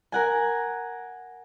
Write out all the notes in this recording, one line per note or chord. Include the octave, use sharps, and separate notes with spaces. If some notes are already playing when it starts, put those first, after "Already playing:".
A#4 F#5 G#5